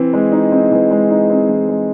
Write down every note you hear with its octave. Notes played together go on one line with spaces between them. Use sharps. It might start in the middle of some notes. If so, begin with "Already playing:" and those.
Already playing: E3 C4
G#3
D#4
C4
E3
G#3
D#4
C4
E3
G#3